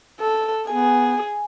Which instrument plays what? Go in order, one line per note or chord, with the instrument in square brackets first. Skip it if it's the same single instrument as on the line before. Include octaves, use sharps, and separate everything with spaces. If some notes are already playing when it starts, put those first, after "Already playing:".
[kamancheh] A4
[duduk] B3 [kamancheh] G#4 [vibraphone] G#5